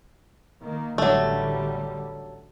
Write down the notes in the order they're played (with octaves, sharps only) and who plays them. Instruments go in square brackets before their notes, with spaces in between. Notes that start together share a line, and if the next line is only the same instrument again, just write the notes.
[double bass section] D#3 A#3
[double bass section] A1 D3 G3 [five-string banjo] F#3 A3